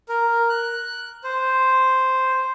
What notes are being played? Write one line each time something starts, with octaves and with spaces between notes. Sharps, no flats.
A#4
F#6
C5